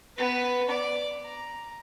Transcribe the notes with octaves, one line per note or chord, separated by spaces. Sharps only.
B3 B4
D5 D6
A#5